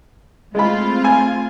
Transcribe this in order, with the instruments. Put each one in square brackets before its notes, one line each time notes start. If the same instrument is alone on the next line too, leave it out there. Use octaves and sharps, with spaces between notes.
[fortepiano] G#3 B5 [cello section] A3 C4 F4
[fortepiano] G#5